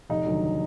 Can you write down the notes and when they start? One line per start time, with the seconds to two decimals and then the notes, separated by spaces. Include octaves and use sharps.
0.10 F1 D#4
0.26 D#2 D3 F#3